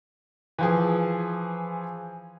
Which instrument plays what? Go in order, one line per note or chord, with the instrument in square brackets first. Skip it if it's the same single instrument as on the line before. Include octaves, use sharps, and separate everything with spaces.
[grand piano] E3 F3 G#4